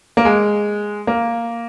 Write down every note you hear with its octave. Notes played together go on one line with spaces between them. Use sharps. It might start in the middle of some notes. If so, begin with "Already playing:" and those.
A#3
G#3
A#3